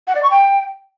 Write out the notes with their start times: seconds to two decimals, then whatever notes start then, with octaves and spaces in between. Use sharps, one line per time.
0.07 F#5
0.15 D5
0.23 C#6
0.31 G5